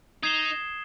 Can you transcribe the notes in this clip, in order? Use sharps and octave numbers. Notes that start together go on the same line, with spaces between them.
D#4 D#6 G#6 C7 E7 G7